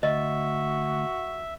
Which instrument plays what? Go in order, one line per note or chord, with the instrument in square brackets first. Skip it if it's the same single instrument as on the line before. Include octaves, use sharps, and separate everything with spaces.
[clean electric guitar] D2 [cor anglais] F#4 [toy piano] D#5 [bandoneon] E5